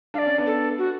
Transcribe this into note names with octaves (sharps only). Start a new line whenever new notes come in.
D4 D5 F5
C#4
B3 D4
A4
F#4